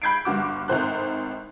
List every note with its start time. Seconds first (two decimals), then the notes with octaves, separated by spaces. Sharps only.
0.02 B5 G6 G#6 C7 D7
0.25 G1 G2 F#4 D6
0.68 G#1 A2 C5 F#6